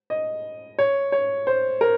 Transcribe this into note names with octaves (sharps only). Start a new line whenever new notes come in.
D#5
C#5
C#5
C5
A#4